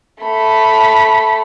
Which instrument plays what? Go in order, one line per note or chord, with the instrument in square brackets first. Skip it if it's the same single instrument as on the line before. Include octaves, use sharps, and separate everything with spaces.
[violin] A3 B5